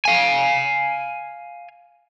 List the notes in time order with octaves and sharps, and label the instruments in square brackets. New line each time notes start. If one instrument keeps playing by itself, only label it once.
[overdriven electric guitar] F5 G#5